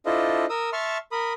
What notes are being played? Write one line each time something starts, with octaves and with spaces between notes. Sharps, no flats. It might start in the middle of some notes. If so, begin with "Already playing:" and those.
D4 E4 F4 A4 C5 D#5
A#4 D#6 E6
E5 A5 C6 C#6 F6
A#4 B5 D#6